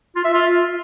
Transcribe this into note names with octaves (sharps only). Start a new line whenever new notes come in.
F4
E5
F4